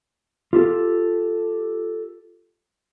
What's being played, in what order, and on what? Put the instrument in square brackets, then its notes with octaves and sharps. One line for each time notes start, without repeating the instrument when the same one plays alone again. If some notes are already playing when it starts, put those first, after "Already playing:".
[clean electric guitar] F4 G4 A4